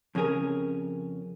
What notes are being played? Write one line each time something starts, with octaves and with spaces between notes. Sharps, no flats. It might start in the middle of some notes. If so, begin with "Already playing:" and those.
F2 C#3 C#4 G#4 A#4